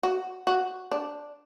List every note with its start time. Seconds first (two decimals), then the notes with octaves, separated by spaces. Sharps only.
0.03 F#4
0.47 F#4
0.91 D4